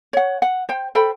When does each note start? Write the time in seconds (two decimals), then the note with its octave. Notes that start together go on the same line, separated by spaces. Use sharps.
0.13 C#5 F#5
0.42 F#5
0.69 C5 G5
0.95 A4 C5 G5 B5